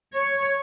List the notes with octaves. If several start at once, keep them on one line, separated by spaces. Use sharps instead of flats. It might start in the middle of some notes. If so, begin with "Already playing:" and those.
C#5